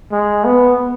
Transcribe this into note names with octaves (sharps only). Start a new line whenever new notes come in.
G#3
B3